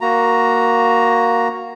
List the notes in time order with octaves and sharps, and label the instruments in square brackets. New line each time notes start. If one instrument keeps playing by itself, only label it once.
[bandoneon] A#3 F#4 A#5